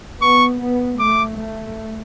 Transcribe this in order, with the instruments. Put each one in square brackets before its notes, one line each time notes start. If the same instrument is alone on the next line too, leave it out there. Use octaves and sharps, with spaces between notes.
[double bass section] B3 [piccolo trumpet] C#6
[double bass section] B3
[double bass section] A3 [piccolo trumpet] D6
[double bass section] A3